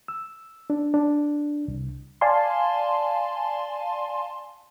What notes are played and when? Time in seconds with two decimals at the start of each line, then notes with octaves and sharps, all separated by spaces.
0.08 E6
0.70 D4
0.94 D4
1.68 C2
2.21 D5 F5 G#5 A5 C6